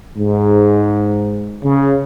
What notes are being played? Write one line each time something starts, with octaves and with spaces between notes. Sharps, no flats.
G#2
C#3